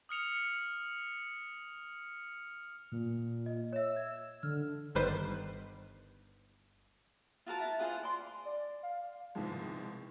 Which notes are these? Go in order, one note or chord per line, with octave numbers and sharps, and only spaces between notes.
D#6 F6 C#7 F7
A#2
D#5
C#5 E5 E6
G#6
D3 F6
G1 D#3 G3 B4 C5
F4 F#4 A#4 A5
E4 A5
F4 G#4 C5 F#5
D5 C6
D5
F5
C2 G#2 B2 D#3 F3 G#3